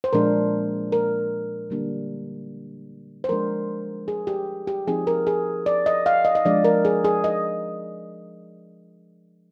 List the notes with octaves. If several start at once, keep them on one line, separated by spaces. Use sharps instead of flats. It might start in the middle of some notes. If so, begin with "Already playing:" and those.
C5
A#2 F3 G#3 D4 A#4
A#4
D3 G3 A#3 D4
C5
F3 G#3 D4 A#4
G#4
G4
G4
F3 C4 D#4 G#4
A#4
G#4
D5
D#5
F5
D#5
D#5
F3 G#3 D4 D5
A#4
G#4
G#4
D#5